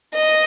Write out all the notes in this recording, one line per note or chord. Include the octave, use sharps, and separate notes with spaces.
D#5